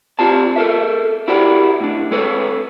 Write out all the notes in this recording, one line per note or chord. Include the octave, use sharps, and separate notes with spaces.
C4 F4 G4 D5 A5
A4 A#4 E5
E4 F#4 G4 A#4 D5 F#5
A2 D4
G#3 A4 B4 C#5